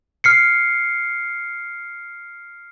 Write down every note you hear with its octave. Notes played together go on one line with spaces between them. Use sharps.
F6 C7 C#7